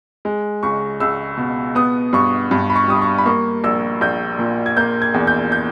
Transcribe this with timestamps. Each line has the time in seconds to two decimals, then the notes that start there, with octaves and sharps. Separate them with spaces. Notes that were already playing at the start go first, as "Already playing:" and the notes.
0.25 G#3
0.63 C#2 C#6
1.00 C#2 E6
1.37 B2
1.75 B3 D#6
2.13 G2 C#6
2.51 G2
2.70 B5
2.76 C#6
2.88 G3 D#6
3.02 C#6
3.18 B5
3.26 A#3 C#6
3.64 A#1 E6
4.01 A#1 G6
4.39 A#2
4.66 G#6
4.77 A#3 G6
5.02 G#6
5.14 E2
5.27 G6
5.52 G6